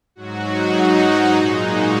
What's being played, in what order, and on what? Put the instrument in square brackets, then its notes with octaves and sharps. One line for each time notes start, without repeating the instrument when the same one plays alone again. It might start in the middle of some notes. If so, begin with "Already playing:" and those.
[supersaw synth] G#2 F#3 F#4
D#4
A#2 G#3 D#4
F#4